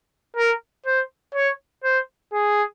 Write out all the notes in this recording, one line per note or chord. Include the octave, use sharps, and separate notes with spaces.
A#4
C5
C#5
C5
G#4